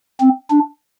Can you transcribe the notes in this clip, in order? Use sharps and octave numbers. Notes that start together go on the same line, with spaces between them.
C4
D4